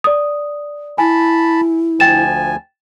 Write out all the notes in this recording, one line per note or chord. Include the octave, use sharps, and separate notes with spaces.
D5 D#6
E4 G#5 A5 B5
D2 F3 G5 G#5 A6 E7